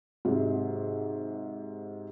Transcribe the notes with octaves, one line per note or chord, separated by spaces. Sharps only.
G#2 C3 F#3